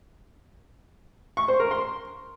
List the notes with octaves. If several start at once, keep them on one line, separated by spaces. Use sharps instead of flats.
C#6
C5
A#4
C6